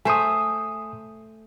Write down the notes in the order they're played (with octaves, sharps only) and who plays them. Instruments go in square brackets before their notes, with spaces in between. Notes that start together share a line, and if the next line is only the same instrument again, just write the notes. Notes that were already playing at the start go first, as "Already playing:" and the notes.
[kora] A3 C5 [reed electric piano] G#5 D#6